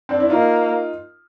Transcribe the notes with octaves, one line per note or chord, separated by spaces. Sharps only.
C4 D4
D4 E4
A#3 D#4 F4